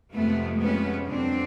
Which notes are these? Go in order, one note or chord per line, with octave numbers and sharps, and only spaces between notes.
F2 C3 F3 G#3 A3 B3
B3 C#4
F2 D3 F#3 C4 D4